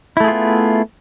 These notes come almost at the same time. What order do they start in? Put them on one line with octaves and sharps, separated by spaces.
E4 A3 G#4 F4 B3